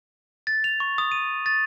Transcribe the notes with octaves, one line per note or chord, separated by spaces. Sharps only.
A6
F7
C#6
D#6
D#7
A6